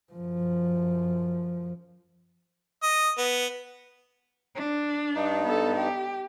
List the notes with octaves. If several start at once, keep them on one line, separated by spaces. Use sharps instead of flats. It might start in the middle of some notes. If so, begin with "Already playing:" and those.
F#2 F3
D#5
B3
D4
G2 D#4
B3 A4
G4